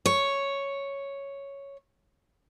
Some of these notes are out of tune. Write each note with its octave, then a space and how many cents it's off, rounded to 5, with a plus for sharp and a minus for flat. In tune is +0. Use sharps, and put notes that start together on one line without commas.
C#5 +0